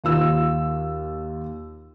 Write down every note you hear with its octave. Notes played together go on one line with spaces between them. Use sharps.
D#2 F4 E6